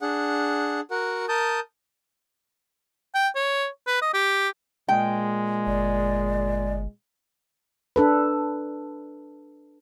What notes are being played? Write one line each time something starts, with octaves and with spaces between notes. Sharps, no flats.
D4 G#4 F#5
F#4 A#4 F#5
A#4 A5 D#6 G6
G5
C#5
B4
D#5
G4
A#2 G#3 G5
G1 D5
D4 A4 B4